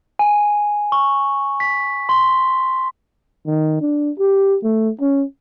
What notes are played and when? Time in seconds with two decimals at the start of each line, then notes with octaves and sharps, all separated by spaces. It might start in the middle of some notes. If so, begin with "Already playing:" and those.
0.19 G#5
0.92 C#6
1.60 B6
2.09 C6
3.47 D#3
3.81 D4
4.19 G4
4.64 A3
5.01 C#4